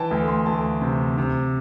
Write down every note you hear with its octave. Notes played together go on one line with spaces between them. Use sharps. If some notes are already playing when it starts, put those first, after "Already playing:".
Already playing: E3 G5 A5
D2 A5
C6
D2 A5
C3
C3